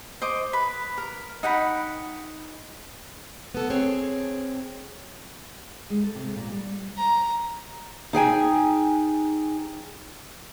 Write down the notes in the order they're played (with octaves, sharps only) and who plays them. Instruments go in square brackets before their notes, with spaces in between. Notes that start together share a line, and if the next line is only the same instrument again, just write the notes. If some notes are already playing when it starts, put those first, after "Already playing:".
[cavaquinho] C5 D#5 D6
B4 B5
A#4
D#4 F#5 G5 B5
[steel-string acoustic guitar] B3 A4
C4 G#4 C#5
[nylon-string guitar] G#3
A4
C3
A#2
G3
[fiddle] A#5
[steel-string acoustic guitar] D#4 G#4 G5 G#5